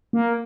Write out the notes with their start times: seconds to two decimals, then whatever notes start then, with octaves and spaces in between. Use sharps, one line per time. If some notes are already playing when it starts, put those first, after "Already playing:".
0.13 A#3